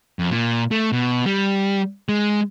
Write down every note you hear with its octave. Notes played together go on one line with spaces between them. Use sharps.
F2
A#2
A3
B2
G3
G#3